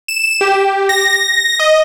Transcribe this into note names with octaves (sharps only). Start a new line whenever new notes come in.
E7
G4
A#6
D#5